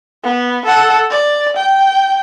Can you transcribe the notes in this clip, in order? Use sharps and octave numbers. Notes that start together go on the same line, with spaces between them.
B3
A4 F#5
D5
G5